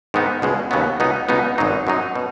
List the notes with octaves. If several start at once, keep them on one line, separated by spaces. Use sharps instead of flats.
G#2 D#3 B3 D#4
C#2 B2 G#3
D#2 C#3 F#3 B3
C#2 B2 B3 D#4
C#2 B2 B3 D#4
G#1 G#2 F#3 D#4
F#2 F#3 D#4
B2